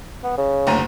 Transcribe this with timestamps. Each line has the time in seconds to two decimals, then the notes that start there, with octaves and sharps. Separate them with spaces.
0.24 B3
0.38 C#3
0.67 F#1 D2 A#5